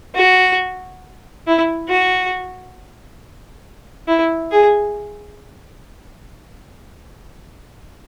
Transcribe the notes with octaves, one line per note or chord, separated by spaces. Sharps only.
F#4
E4
F#4
E4
G#4